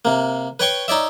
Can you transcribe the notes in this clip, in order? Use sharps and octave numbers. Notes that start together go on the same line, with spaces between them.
C3 A#3
B4 C#5 G5 C#6
D#4 C#5 D5 E5